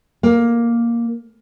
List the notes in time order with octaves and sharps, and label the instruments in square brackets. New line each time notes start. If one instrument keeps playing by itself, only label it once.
[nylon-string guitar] A#3